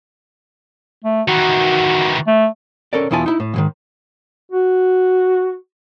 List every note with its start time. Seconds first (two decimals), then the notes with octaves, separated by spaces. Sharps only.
1.04 A3
1.28 D#3 E3 F#4
2.27 A3
2.93 C#4 A4 A#4 D5
3.11 E2 B2 E4 F4 G#5 A5
3.26 D#4 E4
3.40 A2
3.54 E2 G#2 D#3
4.51 F#4